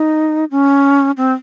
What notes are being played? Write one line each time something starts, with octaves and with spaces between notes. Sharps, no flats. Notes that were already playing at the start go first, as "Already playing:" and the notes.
Already playing: D#4
C#4
C4